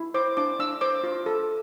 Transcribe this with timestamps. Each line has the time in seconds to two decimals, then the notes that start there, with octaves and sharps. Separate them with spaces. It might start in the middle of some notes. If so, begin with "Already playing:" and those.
Already playing: E4
0.14 C5 D6
0.37 D4 D6
0.59 D4 E6
0.81 C5 D6
1.04 F4
1.26 A4